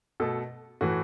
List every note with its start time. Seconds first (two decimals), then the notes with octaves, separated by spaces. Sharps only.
0.20 B2 A3 A4
0.81 A2 E3 A3 F#4